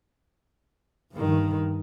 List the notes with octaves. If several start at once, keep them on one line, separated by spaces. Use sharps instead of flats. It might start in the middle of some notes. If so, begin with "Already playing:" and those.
G2 D#3